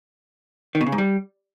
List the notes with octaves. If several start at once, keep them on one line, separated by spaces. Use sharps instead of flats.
D#3
B2
C#3
G#2
G3